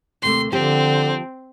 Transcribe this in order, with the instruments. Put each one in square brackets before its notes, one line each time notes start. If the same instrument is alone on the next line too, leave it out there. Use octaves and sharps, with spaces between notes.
[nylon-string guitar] D#2 C3 A3 [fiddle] C6
[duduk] D3 [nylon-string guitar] F3 G4 [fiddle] C4